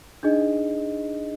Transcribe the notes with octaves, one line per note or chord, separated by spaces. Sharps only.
D4 D#4 G#4 D#5